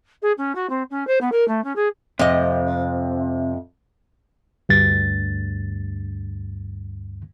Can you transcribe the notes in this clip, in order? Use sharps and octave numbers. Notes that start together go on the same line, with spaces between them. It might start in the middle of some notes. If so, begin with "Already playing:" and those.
G#4
C#4
F#4
C4
C#4
C5
B3
A#4
A3
C#4
G#4
F2 C3 D#5
D2 G2 A6